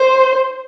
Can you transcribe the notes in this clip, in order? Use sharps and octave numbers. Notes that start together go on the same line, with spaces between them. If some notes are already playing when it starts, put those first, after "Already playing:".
Already playing: C5